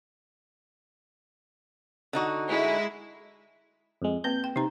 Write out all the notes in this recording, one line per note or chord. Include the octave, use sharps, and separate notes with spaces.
D3 D#4 F#4
G#3 E4
F2 G#3
A#3 C4 B4 G6
G5
C3 D#4 A#5